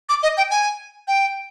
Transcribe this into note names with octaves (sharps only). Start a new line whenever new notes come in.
D6
D#5
G5
G#5
G5